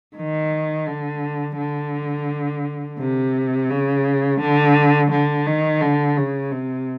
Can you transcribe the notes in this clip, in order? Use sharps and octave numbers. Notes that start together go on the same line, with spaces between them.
D#3
D3
D3
C3
C#3
D3
D3
D#3
D3
C#3
C3